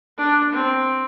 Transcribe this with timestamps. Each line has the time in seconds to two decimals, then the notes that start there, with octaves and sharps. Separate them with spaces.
0.18 D4
0.53 C4